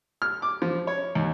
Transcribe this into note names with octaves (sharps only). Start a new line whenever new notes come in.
F6
D6
F3
C#5
D#2